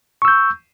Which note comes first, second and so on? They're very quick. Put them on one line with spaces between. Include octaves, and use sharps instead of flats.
C#6 E6 G6